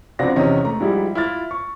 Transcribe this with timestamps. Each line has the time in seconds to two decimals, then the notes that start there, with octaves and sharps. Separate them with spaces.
0.19 C#2 F3 C4 D4 F#4 A#6
0.36 E2 C3 D#3 C#4 D#5 A#5
0.65 A3 A#5
0.80 G#2 F3 G3 G#3 E4 G4
1.15 E4 F4 F6 A6
1.51 C#6